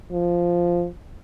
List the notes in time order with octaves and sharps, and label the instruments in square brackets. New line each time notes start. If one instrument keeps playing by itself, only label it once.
[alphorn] F3